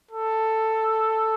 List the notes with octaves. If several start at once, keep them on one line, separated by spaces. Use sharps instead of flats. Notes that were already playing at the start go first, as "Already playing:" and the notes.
A4